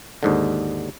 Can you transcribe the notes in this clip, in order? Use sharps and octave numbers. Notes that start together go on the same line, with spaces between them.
D#2 G#2 D3